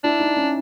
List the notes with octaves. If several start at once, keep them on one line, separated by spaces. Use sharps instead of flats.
D4 E4
D#4
C#4